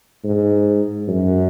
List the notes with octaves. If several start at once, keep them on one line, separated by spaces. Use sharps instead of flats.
G#2
F#2